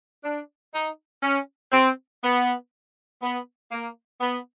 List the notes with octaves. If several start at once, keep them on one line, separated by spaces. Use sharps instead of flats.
D4
D#4
C#4
C4
B3
B3
A#3
B3